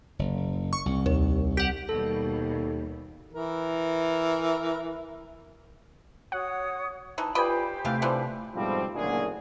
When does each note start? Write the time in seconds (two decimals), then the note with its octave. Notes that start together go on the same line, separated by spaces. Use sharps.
0.19 F#1
0.73 C#6
0.86 C2
1.06 D#2
1.57 G4 F#5
1.89 D#2 B2 G3 A4
3.33 E3 A#4
6.32 F#4 C#5 F#5 D#6
7.18 E3 D#4 A5
7.35 F4 G4 B4 C5 D5 D#5 G#5 B5
7.85 C3 E3 A3 D4 F5
8.02 E3 F3 D4
8.55 G#2 B2 F3 G3 A3 C4
8.94 F#1 A#2 D3 A3 F#4 G#4